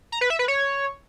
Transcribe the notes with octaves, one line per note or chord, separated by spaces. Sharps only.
A#5
B4
E5
B4
C#5